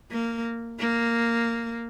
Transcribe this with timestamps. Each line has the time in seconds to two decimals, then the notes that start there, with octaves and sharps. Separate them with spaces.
0.11 A#3
0.79 A#3